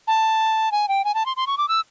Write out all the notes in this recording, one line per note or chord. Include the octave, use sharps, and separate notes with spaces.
A5
G#5
G5
G#5
A5
C6
C6
C#6
D6
E6